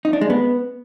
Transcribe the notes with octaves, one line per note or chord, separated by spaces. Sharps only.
D#4
D4
G#3
B3